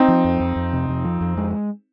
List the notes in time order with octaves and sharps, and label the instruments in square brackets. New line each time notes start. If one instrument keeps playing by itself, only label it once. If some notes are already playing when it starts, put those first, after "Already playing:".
Already playing: [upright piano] C4 D#4
[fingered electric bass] F3
F2
F2
F2
C3
F2
F3
F2
G#3